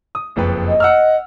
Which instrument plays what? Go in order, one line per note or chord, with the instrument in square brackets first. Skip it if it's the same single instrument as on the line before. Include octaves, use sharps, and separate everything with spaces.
[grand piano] D#6
F#1 F2 B4
[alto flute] D#5
[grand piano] F#5 E6 F6